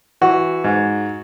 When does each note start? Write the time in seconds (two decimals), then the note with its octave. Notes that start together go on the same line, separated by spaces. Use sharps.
0.21 E3 F#4
0.64 G#2